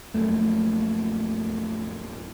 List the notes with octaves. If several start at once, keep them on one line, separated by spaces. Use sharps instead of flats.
A#1 F#2 A#2 A3